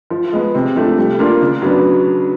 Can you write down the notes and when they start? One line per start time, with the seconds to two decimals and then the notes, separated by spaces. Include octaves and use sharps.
0.10 F3
0.33 G#3 B3
0.55 C3
0.76 F3 A3 D4
0.98 G3
1.19 A#3 D4 F4
1.41 C#3
1.62 F#3 B3 D4